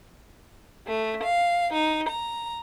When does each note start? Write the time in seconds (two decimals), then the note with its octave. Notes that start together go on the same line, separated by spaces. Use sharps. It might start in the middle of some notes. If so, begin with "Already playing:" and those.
0.86 A3
1.23 F5
1.72 D#4
2.09 A#5